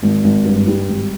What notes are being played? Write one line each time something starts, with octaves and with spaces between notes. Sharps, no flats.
G#1
G#1
G2
G3
G#1